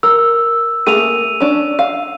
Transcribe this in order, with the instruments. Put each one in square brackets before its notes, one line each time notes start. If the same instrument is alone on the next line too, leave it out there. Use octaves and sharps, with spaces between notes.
[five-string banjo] A#4 [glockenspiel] E6
[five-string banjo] A3 A#3 G#4 [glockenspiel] D#7 F7
[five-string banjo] C#4 D4
F5